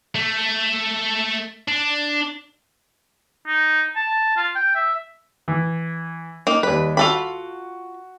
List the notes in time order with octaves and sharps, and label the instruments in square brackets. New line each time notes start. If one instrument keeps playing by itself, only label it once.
[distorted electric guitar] A3
D4
[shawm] D#4
A5
F4
G5
E5
[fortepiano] E3
[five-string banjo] A#3 D#4
[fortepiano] D#2 G3 [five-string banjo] B4
[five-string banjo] F4 A4 B5 [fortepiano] F#4